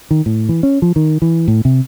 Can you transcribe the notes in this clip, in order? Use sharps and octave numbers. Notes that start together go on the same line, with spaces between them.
D#3
A2
E3
C#4
F3
D#3
E3
A2
C3